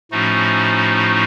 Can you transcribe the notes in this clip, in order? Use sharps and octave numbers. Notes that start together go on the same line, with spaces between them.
A2 F3 A3 C#4 D#4 F#4